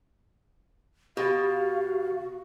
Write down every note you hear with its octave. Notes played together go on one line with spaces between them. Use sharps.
B2 F#4 G4 F5 A6